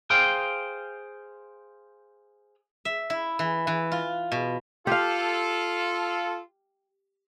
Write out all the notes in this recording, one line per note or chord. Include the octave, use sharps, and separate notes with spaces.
G#4 C5 F5 G5
E5
E4
E3
E3
F4
B2
F4 G4 A4 F5